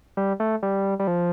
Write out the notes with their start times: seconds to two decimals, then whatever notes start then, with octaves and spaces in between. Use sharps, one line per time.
0.17 G3
0.40 A3
0.63 G3
1.00 G3
1.07 F3